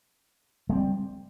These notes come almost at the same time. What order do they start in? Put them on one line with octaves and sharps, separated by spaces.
G#3 C4 G3